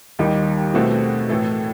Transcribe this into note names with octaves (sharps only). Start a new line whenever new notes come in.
D#2 D#3 G3 D#4
B2 A3 C4 F#4
A2 E3 A3